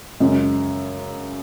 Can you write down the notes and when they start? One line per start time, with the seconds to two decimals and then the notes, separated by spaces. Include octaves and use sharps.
0.20 F#2 C#3 G#3